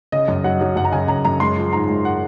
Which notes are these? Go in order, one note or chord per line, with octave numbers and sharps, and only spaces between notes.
C#3 D#5
F#2
F#3 F#5
F#3
F#2 F#5
A#5
C#3 G#5
F#2 A#5
F#2 A#5
G#3 C6
F3
G#2 A#5
G#3
F#5